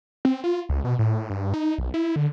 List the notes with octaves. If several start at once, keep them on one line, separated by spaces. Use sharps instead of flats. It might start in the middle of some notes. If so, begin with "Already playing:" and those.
C4
F4
C#2
B2
A2
G2
D#4
B1
E4
D3